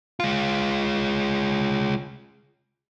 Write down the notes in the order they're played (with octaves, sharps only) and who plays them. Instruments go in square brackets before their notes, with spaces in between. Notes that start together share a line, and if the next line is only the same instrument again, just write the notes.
[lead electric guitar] G#3 F4